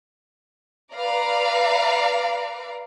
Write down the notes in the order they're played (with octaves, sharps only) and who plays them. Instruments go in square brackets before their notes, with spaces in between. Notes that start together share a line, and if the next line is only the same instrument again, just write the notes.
[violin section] B4 D5 F5 A#5